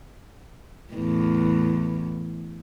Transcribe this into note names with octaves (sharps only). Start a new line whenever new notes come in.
E2 A2